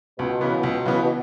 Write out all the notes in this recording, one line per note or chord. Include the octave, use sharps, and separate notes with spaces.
C#2 B2
C#3 E3 B3
C#2
C#3 E3 B3
B2